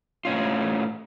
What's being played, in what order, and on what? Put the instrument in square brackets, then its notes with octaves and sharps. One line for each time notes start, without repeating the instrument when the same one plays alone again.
[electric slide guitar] A2 C#4 F4